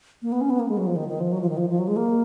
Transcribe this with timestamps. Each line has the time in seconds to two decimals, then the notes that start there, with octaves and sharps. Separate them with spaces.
0.22 A#3
0.32 B3
0.41 C#4
0.50 B3
0.59 A#3
0.68 G#3
0.77 F#3
0.86 F3
0.96 D#3
1.08 D#3
1.20 F3
1.32 F#3
1.41 F3
1.49 D#3
1.57 F3
1.69 F3
1.79 F#3
1.88 G#3
1.96 A#3